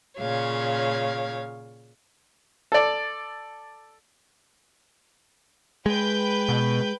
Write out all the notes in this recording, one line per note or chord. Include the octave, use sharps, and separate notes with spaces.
A#2 C#3 C#5 F5
A4 D5
G#3 B4 G5 G6
B2